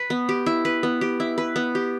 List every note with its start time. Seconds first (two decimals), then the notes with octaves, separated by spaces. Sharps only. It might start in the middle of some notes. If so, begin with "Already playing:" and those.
Already playing: B4
0.10 B3
0.29 G4
0.46 E4
0.65 B4
0.83 B3
1.01 G4
1.20 E4
1.38 B4
1.56 B3
1.75 G4